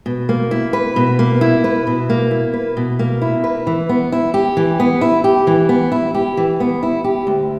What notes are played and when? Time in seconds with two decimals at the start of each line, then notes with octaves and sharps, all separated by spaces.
0.06 B2
0.29 A#3
0.51 E4
0.73 B4
0.96 B2
1.19 A#3
1.41 E4
1.64 B4
1.87 B2
2.10 A#3
2.31 E4
2.53 B4
2.77 B2
2.99 A#3
3.21 E4
3.44 B4
3.67 E3
3.89 B3
4.12 E4
4.34 G4
4.57 E3
4.80 B3
5.01 E4
5.24 G4
5.47 E3
5.69 B3
5.92 E4
6.14 G4
6.37 E3
6.60 B3
6.83 E4
7.04 G4
7.27 D2